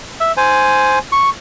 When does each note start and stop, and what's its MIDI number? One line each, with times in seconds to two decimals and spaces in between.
0.20 0.32 76
0.37 0.99 72
0.37 0.99 80
1.12 1.30 85